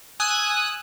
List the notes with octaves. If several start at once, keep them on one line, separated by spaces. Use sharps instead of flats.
G#5 D#6 E6 F#6